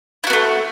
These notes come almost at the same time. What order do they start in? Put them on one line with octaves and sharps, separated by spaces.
E4 F#4 B3 A3